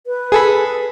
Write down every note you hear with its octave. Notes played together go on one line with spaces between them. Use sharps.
B4
G#4 A4 B5